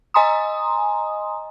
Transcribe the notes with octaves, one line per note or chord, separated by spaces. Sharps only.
D#5 G#5 A#5 C6 D#6